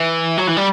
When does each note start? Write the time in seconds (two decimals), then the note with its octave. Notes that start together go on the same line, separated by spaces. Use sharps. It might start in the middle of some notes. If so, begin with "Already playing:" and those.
Already playing: E3
0.38 F#3
0.47 E3
0.57 G3